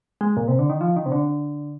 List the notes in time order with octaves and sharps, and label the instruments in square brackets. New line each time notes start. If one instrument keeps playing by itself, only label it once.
[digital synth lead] G#3
A#2
C3
D3
D#3
F3
D#3
C3
D3